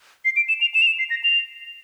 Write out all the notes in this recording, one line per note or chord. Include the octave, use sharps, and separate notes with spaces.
C7
D7
E7
F7
E7
F7
E7
C7
A#6
F7